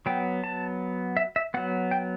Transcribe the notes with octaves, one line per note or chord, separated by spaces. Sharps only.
F#3 B3 G5
A5
E5
E5
F#3 B3 F#5
G5